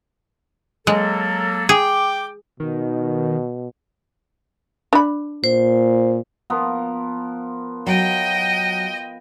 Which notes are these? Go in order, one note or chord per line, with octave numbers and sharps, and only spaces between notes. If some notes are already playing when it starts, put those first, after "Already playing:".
F#3 G#3 A#3 A4
G#4 G5 D6
B2 D#3
D4 B5
A#2 C5
F3 B3 A#4
F#3 D#5 G5